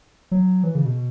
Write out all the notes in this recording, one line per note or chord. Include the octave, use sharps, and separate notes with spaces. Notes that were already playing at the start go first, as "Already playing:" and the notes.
F#3
E3
C#3
B2